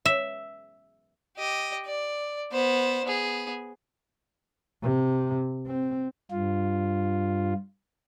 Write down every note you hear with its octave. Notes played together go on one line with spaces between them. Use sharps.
E5
G4 D#5
D5
B3 C5
B3 G#4
C3
C4
G2 F4